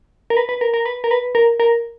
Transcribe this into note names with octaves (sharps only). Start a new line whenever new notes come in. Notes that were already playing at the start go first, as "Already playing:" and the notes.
A#4
B4
B4
A#4
A#4
B4
A#4
B4
A#4
A#4